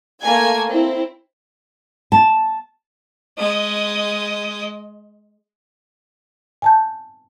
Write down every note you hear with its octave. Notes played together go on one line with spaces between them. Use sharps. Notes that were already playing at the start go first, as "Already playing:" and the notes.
A3 A#3 G#5 G#6
C4 E4
A5
G#3 D#5
G#5 A5 G6